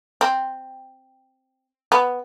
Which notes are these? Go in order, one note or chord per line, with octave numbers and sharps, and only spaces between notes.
C4
B3